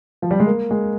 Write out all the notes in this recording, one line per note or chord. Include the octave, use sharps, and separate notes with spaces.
F3
G3
G#3
A#3
G#3